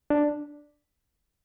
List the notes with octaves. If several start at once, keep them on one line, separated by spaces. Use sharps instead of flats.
D4